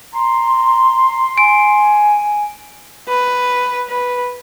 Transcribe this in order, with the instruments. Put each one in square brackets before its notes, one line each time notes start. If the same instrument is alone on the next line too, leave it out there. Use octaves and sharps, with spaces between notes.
[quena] A#5 [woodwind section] C6
[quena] G#5 [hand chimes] D7
[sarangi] B4
B4